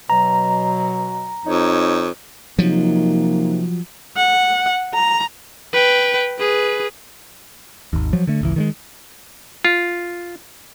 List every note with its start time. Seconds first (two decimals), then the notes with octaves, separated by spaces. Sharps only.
0.10 B2 F#3 A#5
1.45 F2 D#4 C#5
2.59 C3 F3 F#3 A#3 D#4
4.17 F#5
4.95 A#5
5.73 B4 G5
6.39 G#4 B4
7.93 G#1 D#2
8.13 F3 F#3
8.27 D3 A3
8.41 G#1 C#2 E3
8.56 D#3 G3 G#3
9.65 F4